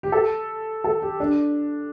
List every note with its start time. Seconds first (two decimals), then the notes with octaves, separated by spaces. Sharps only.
0.03 G4
0.12 A4
0.84 A4
1.02 G4
1.20 D4